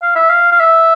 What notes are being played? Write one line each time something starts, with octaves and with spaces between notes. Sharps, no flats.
F5
E5
F5
F5
E5